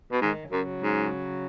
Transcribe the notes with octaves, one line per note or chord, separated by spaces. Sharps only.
B2
G#2 D#3
F#2 C#3 F#3
G#2